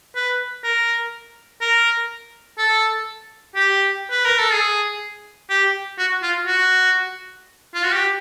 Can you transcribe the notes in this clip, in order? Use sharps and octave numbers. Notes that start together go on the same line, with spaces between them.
B4
A#4
A#4
A4
G4
B4
A#4
A4
G#4
G4
F#4
F4
F#4
F4
F#4
G4